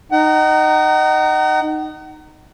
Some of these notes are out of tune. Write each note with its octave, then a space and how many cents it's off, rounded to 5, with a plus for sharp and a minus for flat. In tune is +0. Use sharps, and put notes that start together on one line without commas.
D#4 -10 F#5 +40 A#5 -20